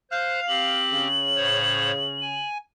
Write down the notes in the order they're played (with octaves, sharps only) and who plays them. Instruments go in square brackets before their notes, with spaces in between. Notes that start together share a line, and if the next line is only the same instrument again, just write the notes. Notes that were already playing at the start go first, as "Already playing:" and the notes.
[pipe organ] C5 F#6 G6 [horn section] F5
[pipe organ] C4 G4 [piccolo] F#7
[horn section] C#3
[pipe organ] A2 C5 C#5
G#5